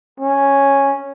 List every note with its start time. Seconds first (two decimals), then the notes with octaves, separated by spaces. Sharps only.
0.20 C#4